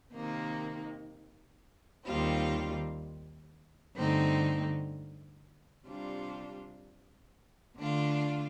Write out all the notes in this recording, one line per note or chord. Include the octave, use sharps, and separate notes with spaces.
C3 D#3 A#3 D#4
D#2 D#3 G3 C4 F4
G2 D3 A3 C4 D#4
C3 G3 D4 F4
D3 A3 D4 F4